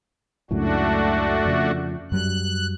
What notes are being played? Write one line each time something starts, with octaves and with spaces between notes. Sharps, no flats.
C#2 F#2 A2 A3 D4 F#4
F2 C#3 F3
F#2 F#3 G3 F#6